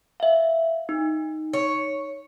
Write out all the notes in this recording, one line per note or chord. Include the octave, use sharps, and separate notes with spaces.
E5 F5
D#4
C#5